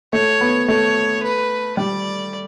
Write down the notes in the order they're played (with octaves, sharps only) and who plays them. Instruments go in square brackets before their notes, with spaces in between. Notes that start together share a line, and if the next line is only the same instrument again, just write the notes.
[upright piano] A3 [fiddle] C#5
[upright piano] B3
[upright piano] A3 [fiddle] C#5
[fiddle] B4
[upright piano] G3 [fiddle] D5